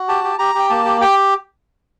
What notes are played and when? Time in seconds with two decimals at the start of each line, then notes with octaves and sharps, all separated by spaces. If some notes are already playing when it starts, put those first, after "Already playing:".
Already playing: F#4
0.08 G4 A5
0.24 G4
0.39 G4 A#5
0.55 G4 G5
0.70 A#3 A5
0.85 G4
1.01 G4 G5